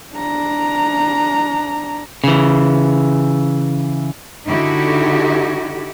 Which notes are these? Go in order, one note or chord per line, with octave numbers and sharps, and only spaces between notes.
D4 A#5
C#3 E3
D3 D#4 E4 F#4 G4